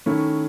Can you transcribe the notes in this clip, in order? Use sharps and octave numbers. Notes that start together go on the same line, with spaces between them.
D#3 A3 C#4 E4